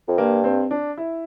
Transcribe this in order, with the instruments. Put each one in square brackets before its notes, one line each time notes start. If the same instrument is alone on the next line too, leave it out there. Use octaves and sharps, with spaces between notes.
[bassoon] F2
[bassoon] G2 [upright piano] A#3
[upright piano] C4
D4
E4